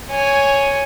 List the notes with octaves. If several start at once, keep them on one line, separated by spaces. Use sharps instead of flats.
C#5 G#5